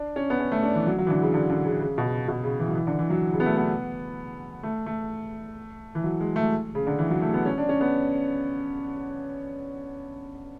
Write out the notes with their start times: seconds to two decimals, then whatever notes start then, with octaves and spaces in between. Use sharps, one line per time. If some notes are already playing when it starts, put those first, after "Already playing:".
Already playing: D4
0.16 C#4
0.30 B3
0.40 C#4
0.52 A3
0.63 D4
0.75 E3
0.87 F#3
0.98 F#3
1.07 E3
1.10 D3
1.22 C#3
1.34 D3
1.50 D3
1.65 C#3
1.81 C#3
1.98 B2
2.05 C#3
2.28 B2
2.44 C#3
2.59 E3
2.69 F#3
2.75 E3
2.87 D3
2.99 E3
3.10 F#3
3.34 C#3
3.40 B3
3.46 A3
3.57 B3
4.63 A3
4.86 A3
5.95 E3
6.04 F#3
6.20 G#3
6.36 A3
6.75 C#3
6.87 D3
6.99 E3
7.10 F#3
7.22 A3
7.34 B3
7.45 C#4
7.58 D4
7.69 C#4
7.81 B3